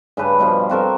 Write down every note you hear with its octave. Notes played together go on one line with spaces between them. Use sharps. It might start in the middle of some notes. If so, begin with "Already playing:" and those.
G2 C#3 B4 A5
G2 B2 F3
C4 F#4 A4 A#4